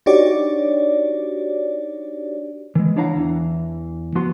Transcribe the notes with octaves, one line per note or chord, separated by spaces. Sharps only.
D4 D#4 F#4 G4 C#5 D5
E3 G#3
D4 E4 C#5 F5 F#5 A#5
E2 E3
F3 B3 F#4 C6